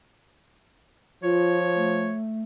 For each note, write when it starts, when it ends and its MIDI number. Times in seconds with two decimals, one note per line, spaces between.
1.23 2.13 53
1.23 1.58 65
1.23 2.19 73
1.76 2.44 57